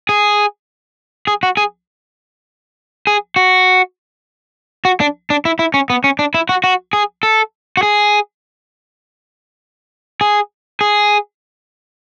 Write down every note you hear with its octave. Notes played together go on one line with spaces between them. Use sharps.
G#4
G#4
F#4
G#4
G#4
F#4
F#4
D4
D4
E4
E4
C#4
B3
C#4
D4
E4
F#4
F#4
G#4
A4
F#4
G#4
G#4
G#4